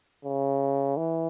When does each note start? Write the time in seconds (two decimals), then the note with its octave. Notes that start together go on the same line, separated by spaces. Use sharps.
0.25 C#3
0.97 E3